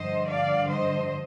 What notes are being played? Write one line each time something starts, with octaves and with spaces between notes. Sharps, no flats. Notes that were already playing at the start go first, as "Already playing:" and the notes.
Already playing: G2 D3 F3 C5 D#5
D5 F5
C5 D#5